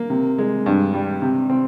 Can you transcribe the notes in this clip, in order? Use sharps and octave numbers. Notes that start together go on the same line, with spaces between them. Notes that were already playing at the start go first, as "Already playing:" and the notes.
Already playing: A#3
C3
G#3
G2
G3
C3
C4